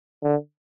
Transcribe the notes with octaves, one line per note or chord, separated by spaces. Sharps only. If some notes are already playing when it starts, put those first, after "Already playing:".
D3